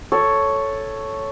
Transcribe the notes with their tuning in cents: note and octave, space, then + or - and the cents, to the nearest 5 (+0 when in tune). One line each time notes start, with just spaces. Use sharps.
A4 +0 C#5 +0